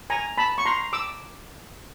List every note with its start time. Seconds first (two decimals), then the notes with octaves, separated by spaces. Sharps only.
0.10 G#5 A#5
0.38 A5 B5
0.58 C#6
0.65 A#5 C6
0.93 D6 E6